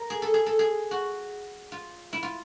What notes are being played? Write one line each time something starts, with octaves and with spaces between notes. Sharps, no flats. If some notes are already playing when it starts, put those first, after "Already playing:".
Already playing: A#4
G#4
A4
G#4
A4
G#4
F#4
F4
E4
F4